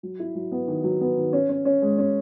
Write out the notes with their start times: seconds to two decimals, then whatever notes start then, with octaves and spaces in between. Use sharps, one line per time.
0.03 F#3
0.20 E4
0.35 F#3
0.52 B3
0.68 D#3
0.84 F#3
1.01 B3
1.17 D#3
1.33 C#4
1.49 C#4
1.65 C#4
1.82 G#3
1.98 C#4